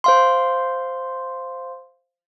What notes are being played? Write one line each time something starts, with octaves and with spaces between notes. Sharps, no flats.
C5 F5 C6